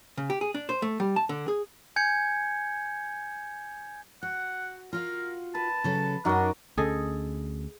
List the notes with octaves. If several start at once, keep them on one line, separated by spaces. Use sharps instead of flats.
C#3
G4
G#4
D4
C5
A3
G3
A5
D3
G#4
G#5 G6 G#6 C#7
F#4 F#5
F4 F#4 A#4 F5
B4 A5
C#3 F#3 A4
F#2 D4 D#4 F#4 A#4 D#5
D2 C#4 G#4 A4 D#5